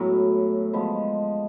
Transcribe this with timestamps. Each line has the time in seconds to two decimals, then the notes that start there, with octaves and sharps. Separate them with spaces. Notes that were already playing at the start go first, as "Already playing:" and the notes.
Already playing: A2 F#3 B3
0.73 F3 G#3 B3